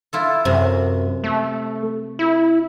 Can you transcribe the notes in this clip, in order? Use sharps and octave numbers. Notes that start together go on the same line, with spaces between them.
E4 F4 A4
F#2 C3
A3
E4